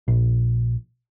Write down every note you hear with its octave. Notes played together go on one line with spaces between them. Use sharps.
A#1